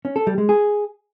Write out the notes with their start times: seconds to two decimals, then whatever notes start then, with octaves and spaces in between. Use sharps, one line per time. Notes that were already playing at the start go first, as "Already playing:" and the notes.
0.05 C#4
0.16 A4
0.27 G3
0.38 G#3
0.49 G#4